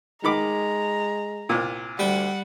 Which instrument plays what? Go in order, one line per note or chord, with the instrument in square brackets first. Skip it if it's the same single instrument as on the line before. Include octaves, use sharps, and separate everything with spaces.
[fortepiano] D#3 B5 D6 [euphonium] G#3 [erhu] A#5
[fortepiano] C2 A#2
[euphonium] D2 [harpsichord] G3 G5 [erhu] F#5